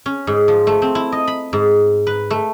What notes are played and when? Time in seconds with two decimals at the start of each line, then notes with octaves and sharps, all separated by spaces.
0.06 C#4
0.27 G#2
0.48 F3
0.67 A3
0.82 C4
0.95 E4
1.12 D#5
1.27 B5
1.53 G#2
2.07 B4
2.31 A3